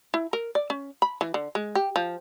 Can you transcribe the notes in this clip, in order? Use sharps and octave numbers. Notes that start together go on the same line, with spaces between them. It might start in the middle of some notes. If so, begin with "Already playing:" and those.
E4
A#4
D5
C#4
B5
E3
D3
G#3
G4
F3